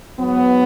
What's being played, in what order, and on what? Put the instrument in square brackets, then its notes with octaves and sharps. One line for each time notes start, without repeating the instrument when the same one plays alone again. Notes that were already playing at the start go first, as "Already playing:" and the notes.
[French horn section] G#2 F#3 B3